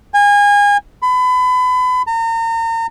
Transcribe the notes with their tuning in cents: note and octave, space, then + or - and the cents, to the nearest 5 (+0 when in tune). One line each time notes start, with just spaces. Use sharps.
G#5 -30
B5 +30
A#5 -35